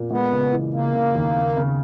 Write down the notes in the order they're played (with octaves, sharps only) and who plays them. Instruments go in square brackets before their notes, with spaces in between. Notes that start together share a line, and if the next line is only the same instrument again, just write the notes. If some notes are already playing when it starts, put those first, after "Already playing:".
Already playing: [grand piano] A#2
[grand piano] G#3 [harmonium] B3
[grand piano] C#3
E3
[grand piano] C#3 [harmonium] A#3
[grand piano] C#3
D#2
C#3
C#3